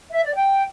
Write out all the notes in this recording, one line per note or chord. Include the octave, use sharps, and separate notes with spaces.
E5
D5
G5